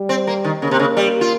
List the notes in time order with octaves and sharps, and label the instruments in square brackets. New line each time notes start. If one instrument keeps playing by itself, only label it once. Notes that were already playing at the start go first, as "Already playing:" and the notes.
Already playing: [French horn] G3
[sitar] C4
A#3
D#3
[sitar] C#3 [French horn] A#3
[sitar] C3
C#3
G3
F4